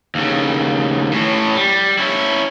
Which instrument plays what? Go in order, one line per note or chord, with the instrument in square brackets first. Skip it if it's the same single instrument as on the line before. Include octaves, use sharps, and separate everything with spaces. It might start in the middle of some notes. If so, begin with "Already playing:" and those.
[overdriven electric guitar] D#2 C#3
A2 C#4
G3
C#4 E4